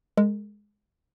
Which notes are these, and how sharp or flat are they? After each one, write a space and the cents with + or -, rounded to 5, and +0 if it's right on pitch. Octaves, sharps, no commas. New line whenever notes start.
G#3 +0 A#4 -35